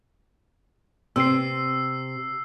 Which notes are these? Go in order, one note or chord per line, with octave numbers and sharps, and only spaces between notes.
C3 C4 E6 C7